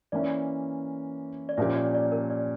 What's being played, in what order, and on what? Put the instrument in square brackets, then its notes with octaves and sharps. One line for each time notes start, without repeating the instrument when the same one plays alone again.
[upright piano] E3 A#3 C#4 [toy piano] D5
[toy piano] D5
[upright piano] A#2 F3 A#3 C#4 G4 [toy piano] E5
[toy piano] D5
D5
A#4
D5